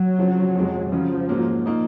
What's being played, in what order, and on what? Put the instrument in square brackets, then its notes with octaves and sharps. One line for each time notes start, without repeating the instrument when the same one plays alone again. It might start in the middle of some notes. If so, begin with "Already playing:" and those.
Already playing: [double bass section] F#3
[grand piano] C#3 F3 C4
F2 C3 F3 G#3
[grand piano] C#3 F#3 C#4 [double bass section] F3
[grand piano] G#2 F#3 A#3
A#2 F3 A#3 D#4